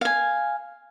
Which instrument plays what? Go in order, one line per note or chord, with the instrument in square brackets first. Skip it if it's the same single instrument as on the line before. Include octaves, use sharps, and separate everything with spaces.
[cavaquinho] F5 G#5